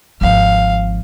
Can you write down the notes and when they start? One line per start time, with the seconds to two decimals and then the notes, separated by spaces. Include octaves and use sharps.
0.21 G#1 F3 F5